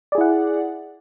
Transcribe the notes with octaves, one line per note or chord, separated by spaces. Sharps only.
E4 G#4 D5 F#5